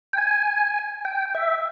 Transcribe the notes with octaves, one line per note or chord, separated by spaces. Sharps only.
G5
G#5
G5
E5